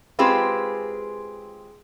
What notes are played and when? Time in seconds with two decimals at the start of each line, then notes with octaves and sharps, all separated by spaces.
0.19 G#3 C4 F4 G4 G#4 B4